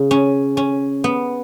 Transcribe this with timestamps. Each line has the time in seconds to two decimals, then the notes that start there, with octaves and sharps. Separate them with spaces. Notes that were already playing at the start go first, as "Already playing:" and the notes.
Already playing: C#3
0.11 C#4
0.57 C#4
1.04 B3